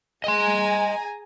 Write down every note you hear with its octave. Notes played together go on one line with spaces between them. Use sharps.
G#4 D#5 G#5 A#5 C6